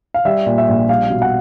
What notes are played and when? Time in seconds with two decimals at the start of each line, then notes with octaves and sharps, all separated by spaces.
0.14 F5
0.25 G3 E5
0.46 A#2
0.58 E5
0.68 A#1
0.89 G3 F5
1.10 B2
1.22 F#5